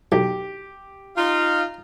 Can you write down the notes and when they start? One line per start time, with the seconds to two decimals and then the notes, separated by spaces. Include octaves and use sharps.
0.12 B1 G4
1.17 D#4 F4